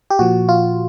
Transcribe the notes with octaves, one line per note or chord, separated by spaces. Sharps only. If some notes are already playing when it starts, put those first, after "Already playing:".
G4
A#2 F3 F#4
F4